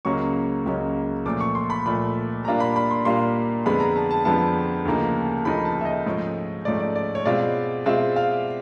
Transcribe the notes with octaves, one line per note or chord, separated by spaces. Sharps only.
C#2 C#3 F#3 A#3 C#4 C#6
C#2 C#3 F#3 A#3 C#4
A#2 F3 A3 D6
C#6
C6
B5
A#2 F3 A3 B5
A#2 G3 A#3 D4 F4 A#5
B5
B5
C6
A#2 G3 A#3 D4 F4 C6
F2 D3 F3 G#3 B3 B5
A#5
A5
A5
F2 D3 F3 G#3 B3 A5
D2 C#3 F3 A#3 D#4
D2 C#3 F3 A#3 D#4 B5
A5
E5
D#5
G#2 F3 A3 C#4
G#2 F3 A3 C#4 D5
D5
D5
C#5
B2 G#3 C4 F4 D5
B2 G#3 C4 F4 E5
F5